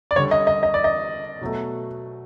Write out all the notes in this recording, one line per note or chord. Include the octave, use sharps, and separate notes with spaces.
D5
D3 G3 C#5
D#5
D#5
D#5
D5
D#5
B2 F#3 A3